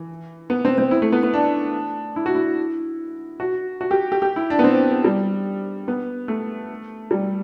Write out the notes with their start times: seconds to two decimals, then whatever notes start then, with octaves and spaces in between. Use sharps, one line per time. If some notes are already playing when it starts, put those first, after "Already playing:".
Already playing: E3
0.50 B3
0.65 C4
0.78 C4
0.91 E4
1.02 A3
1.12 B3
1.23 B3
1.34 D4
2.16 E4
2.26 F#4
2.35 E4
3.40 F#4
3.81 F#4
3.91 G4
4.12 G4
4.22 G4
4.36 E4
4.50 D4
4.59 B3
4.64 C4
4.91 B3
5.04 G3
5.88 B3
6.28 A3
7.11 G3